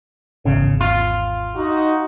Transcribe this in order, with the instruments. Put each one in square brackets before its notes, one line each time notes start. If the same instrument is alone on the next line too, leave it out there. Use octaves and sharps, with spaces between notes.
[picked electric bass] G#1 E2 [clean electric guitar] C#3
[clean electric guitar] F4
[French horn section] D#4 F#4